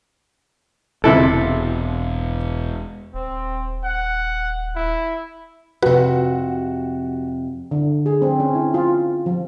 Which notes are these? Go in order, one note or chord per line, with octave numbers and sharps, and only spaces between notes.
E1 C3 E4 A4
D#1 C4
F#5
E4
F2 A2 C3 F#4 B4 F#5
D3
G#4
C4
C#4
E4
F4
F3